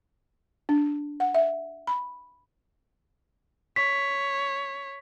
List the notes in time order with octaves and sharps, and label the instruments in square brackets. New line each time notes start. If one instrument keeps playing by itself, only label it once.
[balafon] D4
F#5
E5
B5
[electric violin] C#5 [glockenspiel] B6